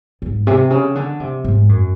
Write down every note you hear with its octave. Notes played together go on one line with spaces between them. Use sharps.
G#2
C3
C#3
D3
C3
G#2
F#2